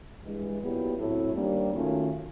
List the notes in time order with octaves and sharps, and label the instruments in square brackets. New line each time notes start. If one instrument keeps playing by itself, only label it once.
[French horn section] G2 E3 G#3
A#2 F#3 B3 E4 G4
A2 F#3 A3 C4 E4
D#2 D#3 G3 A#3 D4
D#3 F#3 A3 C#4 F4